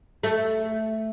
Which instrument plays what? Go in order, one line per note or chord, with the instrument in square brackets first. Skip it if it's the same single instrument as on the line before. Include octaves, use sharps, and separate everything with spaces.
[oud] A3